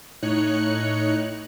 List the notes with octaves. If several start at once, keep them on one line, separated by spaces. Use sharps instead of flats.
A2 D#4 C#5 F#6 C#7